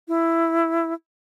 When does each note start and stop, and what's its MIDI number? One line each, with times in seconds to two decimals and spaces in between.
0.08 0.93 64